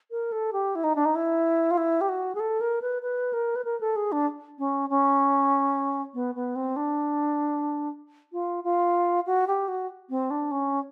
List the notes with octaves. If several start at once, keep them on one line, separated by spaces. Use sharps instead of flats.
A#4
A4
G4
E4
D#4
D4
D#4
E4
F4
E4
G4
F#4
G#4
A4
A#4
B4
B4
A#4
B4
A#4
A4
G#4
D4
C#4
C#4
B3
B3
C4
D4
F4
F4
F#4
G4
F#4
C4
D4
C#4